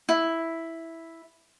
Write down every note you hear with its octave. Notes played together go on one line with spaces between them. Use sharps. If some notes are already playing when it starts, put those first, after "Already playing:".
E4